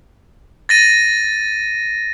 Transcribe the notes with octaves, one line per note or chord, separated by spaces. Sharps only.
A6 A#6 D#7